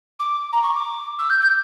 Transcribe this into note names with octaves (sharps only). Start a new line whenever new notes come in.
D6
A#5
C#6
D6
E6
G6
G6